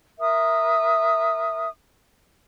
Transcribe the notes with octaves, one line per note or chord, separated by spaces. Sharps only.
A#4 E5 D#6